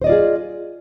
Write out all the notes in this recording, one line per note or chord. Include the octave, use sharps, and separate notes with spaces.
F4 G#4 C5 D5 D#5